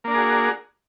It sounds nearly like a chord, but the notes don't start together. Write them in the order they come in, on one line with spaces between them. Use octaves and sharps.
A#3 D4 A#4 G#4 F#4